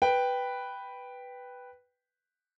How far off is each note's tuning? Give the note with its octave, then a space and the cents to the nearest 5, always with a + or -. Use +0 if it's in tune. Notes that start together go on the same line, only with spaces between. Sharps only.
B4 +0 G5 +0